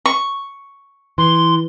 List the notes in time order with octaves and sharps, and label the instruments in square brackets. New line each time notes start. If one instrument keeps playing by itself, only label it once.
[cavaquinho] C#6
[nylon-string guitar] E3 [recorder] C6